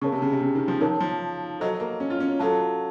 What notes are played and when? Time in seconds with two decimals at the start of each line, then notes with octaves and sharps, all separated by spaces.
0.01 C#3 A#4 C#5 A5 C#6
0.12 C3
0.22 C#3
0.32 C3
0.41 C#3
0.55 D#3
0.68 F3
0.81 D#3 D#4 A#4 C#5 A5
1.00 F3
1.60 F#3 A4 C5 D#5 A5
1.80 A#3
2.00 C#4
2.10 F4
2.20 C#4
2.40 F#3 F4 A4 C#5 F5 A5